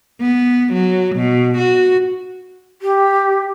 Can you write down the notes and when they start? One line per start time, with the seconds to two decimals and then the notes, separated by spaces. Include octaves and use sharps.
0.21 B3
0.73 F#3
1.16 B2
1.58 F#4
2.81 G4